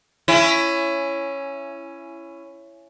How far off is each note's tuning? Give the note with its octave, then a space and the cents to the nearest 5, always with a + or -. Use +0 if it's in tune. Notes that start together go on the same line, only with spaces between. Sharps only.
C#4 +0 E4 +20